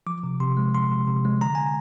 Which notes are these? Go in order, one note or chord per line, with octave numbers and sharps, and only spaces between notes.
F3 D6
C3
C3 C6
G#3
F3 C6
C3
C3
G#3
D3 A#5
G#5